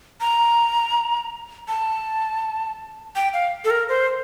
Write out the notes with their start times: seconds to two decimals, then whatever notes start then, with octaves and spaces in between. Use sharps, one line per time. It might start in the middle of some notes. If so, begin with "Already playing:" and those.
0.21 A#5
1.68 A5
3.16 G5
3.33 F5
3.64 A4
3.70 A#4
3.89 C5